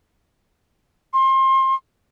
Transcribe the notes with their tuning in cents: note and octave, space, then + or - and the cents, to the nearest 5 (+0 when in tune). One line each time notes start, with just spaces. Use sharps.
C6 +30